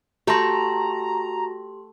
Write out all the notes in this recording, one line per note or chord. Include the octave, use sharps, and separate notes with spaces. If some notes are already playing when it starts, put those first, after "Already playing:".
A3 F#4 G4 G5 A5 A#5 C6 A#6